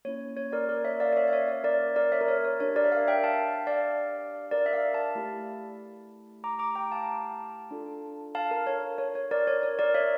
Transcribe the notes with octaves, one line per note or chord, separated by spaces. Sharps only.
A#3 C#4 E4 C#5
C#5
A#4 D5
A#4 D5
C#5 E5
D5 F5
D5
C#5 E5
F5
C#5 E5
C#5
A#4 D5
A#4 D5
C#5 E5
A#4
C#5
C#5
D4 G4 C#5
A#4 D5
E5
D5 F5
E5 G5
F5 A5
D5 F5
A#4 D5
E5
D5 F5
F5 A5
A3 E4 G4
A#5 D6
A#5 D6
G5 A#5
F5 A5
D4 F4 A4
F5 A5
A#4
C#5
C#5
C#5
A#4 D5
C#5
C#5
A#4 D5
C#5 E5